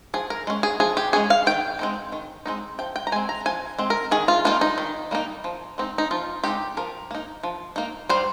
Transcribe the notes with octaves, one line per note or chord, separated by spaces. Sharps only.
F3 G#4
A#4
G#3 C#4
G#4
F3 G#4
G4
G#3 C#4 G#4
F5
D#3 G5
G#3 C4 D#4
D#3
G#3 C4 D#4
F3 G5
G5
A#5
G#3 C4 G#5
A#5
F3 G#5
G#3 C4
A#4
D#3 G#4
F4
G3 A#3 D#4 F4
D#4
D#3
G3 A#3 D#4
F3
G#3 C4 D#4
D#4
F3 F4
G#3 C4 D#4 G4
F3 A#4
A#3 D#4
F3
A#3 D#4
G3 C5